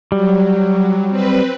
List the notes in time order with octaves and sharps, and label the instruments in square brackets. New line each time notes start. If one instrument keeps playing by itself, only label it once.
[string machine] F#3 [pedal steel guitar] G3
[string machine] C4 B4